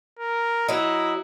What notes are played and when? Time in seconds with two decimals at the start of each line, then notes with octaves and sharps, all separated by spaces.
0.19 A#4
0.68 F#3 D#4 E4